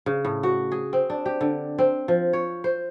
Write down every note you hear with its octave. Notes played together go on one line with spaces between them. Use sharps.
C#3
A2
F#4
G#4
C4
D4
G4
D3
C4
F3
C#5
C5